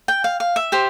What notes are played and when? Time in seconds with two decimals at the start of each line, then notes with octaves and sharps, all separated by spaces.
0.08 G5
0.24 F5
0.40 F5
0.56 E5
0.72 G4 C5